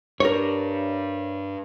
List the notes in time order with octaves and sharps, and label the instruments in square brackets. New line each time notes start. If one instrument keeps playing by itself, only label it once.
[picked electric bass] G2 [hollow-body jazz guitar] A#4 C#5